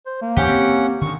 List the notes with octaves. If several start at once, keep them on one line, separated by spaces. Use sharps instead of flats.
C5
A#3
E2 D3 C#4 G4 F#5
C4
D3 D#3 C#6